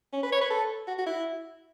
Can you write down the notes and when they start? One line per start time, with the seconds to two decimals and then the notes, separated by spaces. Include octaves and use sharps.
0.13 C#4
0.23 B4
0.32 C#5
0.41 B4
0.50 A4
0.87 F#4
0.98 F#4
1.06 E4